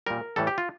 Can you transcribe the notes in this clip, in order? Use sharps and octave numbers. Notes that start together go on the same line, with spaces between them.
A#2 G3 A#4
A2 E3 G3 A4
G4
F4